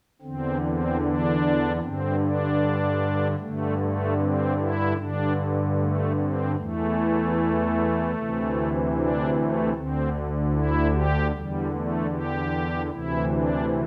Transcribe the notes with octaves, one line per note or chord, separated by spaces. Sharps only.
E2 D3 C4
C4
D4
G2 D3 C4
D4
G2 D3 A3
A3
C4
E4
G2 D3 D4
A3
C4
E2 E3 A3
D2 C3 E3
D4
A3
D2 D3 C4
E4
G4
E2 D3 G3
A3
G4
D2 C3 E3 E4
D4